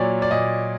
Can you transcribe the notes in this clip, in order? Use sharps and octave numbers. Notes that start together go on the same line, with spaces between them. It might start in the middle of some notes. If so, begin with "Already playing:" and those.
Already playing: A#2 F#3 C#5 D5
D5
A#2 D#5